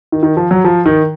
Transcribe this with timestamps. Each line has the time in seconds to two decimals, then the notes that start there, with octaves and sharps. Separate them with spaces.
0.12 D#3
0.23 D#3
0.37 F3
0.51 F#3
0.65 F3
0.86 D#3